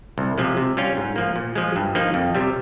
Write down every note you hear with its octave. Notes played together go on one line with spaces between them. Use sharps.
C2
C3 F3 G#3
C3
G3 C#4 F4
G#2
F3 A#3
A#2
F3 G#3
G2
F3 A#3 D#4
F2
C3 G3